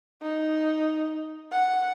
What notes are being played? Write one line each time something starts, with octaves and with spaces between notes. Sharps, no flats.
D#4
F#5